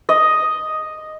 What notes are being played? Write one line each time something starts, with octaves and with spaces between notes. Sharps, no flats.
D#5